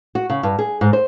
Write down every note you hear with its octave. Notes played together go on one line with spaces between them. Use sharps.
F#4
C#3
G2
G#4
G#2
C5